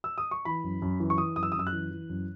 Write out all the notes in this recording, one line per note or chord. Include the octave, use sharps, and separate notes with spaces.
E6
D#6
C#6
E3 B5
F#2
F#2
E3
C#6
E3 D#6
F#2 D#6
E6
D#6
F#2 E6
F#6
E3
E3
F#2